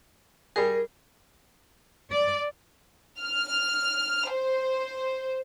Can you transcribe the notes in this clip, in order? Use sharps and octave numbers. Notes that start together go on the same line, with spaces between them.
G3 G#4 A#4
D5
F6
C5